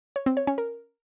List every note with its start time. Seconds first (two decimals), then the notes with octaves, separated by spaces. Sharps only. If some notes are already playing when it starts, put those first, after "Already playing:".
0.16 C#5
0.26 C4
0.37 C#5
0.47 C#4
0.58 A#4